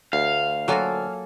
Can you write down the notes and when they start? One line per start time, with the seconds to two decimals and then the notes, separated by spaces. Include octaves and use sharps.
0.13 D2 F5
0.68 F#3 A#3 F4 F#4 A4 G#5